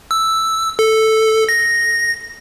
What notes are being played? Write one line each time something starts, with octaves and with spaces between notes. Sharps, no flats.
E6
A4
A#6